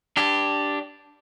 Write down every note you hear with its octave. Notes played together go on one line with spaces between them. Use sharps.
D4 G4